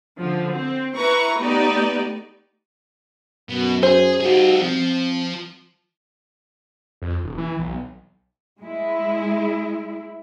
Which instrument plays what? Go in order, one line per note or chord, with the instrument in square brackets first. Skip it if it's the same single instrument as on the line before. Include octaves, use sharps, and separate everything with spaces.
[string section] D3 F3
C4
E4 B4 A#5 C#6
A3 B3 D#4 G4 D5
[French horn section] F#2 [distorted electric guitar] B2
[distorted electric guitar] G#4 [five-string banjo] C5
[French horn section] G3 D#4 F#4 [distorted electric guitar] F4 G#4
[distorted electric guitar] F3 [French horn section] C4
[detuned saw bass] F2
D#1
E3
B1
[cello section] G#3 E4